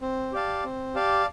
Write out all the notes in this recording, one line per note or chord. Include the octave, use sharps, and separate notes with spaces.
C4
G4 D5 F5 A5
C4
G4 D5 F5 A5